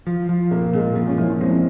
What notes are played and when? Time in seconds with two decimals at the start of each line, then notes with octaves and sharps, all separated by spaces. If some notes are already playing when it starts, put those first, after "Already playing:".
0.07 F3
0.29 F3
0.51 A#2 A#3
0.73 A#2 G#3
0.96 F3 A#3
1.07 C#4
1.18 F3 E4
1.30 C#4
1.40 G#3 C4